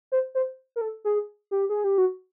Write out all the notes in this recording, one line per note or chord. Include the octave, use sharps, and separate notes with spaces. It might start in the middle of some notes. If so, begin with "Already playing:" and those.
C5
C5
A#4
A4
G#4
G4
G#4
G4
F#4